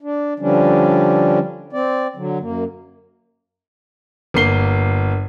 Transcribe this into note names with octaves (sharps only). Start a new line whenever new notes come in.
D4
D3 F3 G3 C#4 D4
C4 D5
D3 F#3
F#2 A#3
G1 A#3 C7 G7